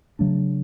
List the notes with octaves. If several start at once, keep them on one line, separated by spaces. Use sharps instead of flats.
C#3 F#3 A3 D4